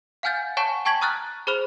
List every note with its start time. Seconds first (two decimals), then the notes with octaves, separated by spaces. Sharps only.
0.23 F5 F#5 G#5 F6 G6 A6
0.57 C#5 F#5 G#5 A5 C#6 E7
0.85 G5 A5 C#6 G#6 B6 F#7
1.01 A#5 D#6 F6 F#6 A6
1.47 G#4 C5 B5 F6 F7